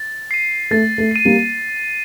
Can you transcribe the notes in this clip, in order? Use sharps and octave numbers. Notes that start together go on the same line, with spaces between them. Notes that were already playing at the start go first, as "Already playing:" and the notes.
Already playing: A6
C7 D#7
A3 A6
A3
C7 D#7
G3 A#3